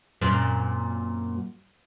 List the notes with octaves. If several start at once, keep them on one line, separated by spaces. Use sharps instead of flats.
F#2 A#2 C4